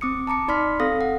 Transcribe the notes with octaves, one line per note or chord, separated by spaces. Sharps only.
C4 D6 D#6 C#7
A5 A#5 D6 C#7
D#4 D5 B5 C6 F6 B6
C4 A4 F5 D#6 A#6
F#5